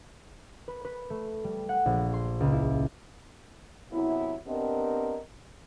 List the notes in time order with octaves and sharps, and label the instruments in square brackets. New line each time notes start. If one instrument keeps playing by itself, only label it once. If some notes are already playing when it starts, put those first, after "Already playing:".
[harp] B4
B4
A3
G3
F#5
A#1
C6
C#2
E4
[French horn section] F#2 C3 B3 E4
B3 C4 D4 G4 A#4 D#5